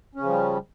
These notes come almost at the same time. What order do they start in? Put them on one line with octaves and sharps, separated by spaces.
C#4 C#3 F3 G3